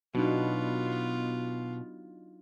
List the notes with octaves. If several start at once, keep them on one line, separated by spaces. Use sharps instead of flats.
B2 F#3 B3 D4 D#4 F4